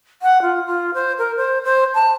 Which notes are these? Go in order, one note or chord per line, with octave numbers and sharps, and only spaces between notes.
F#5
F4
F4
C5
A#4
C5
C5
A5